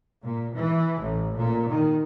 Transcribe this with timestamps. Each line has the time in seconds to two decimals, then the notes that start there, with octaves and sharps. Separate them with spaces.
0.24 A#2
0.54 E3
1.01 A1
1.36 A#2
1.70 D#3